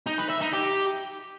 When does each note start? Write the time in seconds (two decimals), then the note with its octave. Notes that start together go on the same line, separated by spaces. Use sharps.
0.07 D#4
0.18 B4
0.30 E5
0.41 D#4
0.53 G4